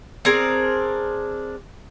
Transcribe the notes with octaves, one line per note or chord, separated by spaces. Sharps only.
C4 D4 G#4 A#4